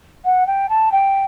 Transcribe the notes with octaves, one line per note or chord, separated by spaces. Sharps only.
F#5
G5
A5
G5